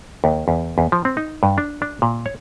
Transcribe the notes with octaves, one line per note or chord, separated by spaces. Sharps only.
D#2
E2
E2
F3
C4
D#4
G2
D4
D4
A#2
C#5